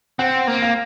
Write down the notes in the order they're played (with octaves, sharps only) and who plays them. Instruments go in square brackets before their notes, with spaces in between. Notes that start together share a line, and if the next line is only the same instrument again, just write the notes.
[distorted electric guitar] C4 [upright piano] F#5
[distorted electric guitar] A#3
[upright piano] F5